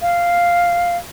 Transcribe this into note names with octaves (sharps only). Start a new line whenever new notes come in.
F5